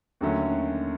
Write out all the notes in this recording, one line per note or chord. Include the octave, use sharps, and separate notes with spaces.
D#2 D3 F#3 A3 C#4